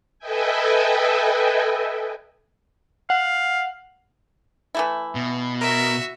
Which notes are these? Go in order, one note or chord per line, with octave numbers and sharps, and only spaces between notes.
A4 B4 D#5 E5 G5 G#5
F5 F#5
E3 A3 E4
B2
F#4 A#4 E5